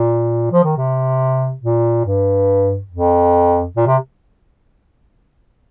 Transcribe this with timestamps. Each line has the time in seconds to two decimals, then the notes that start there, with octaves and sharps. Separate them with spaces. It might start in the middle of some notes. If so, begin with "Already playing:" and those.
Already playing: A#2
0.52 F3
0.64 D#3
0.77 C3
1.62 A#2
2.05 G2
2.91 F2
3.77 A#2
3.86 C3